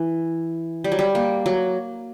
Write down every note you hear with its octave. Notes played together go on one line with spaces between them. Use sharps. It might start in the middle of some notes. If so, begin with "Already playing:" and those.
Already playing: E3
G3
F#3
G3
A#3
F#3